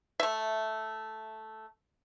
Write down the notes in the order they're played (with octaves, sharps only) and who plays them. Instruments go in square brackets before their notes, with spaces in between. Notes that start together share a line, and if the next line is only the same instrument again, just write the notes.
[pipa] A3 E5